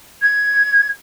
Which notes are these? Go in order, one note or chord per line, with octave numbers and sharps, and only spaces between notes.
G#6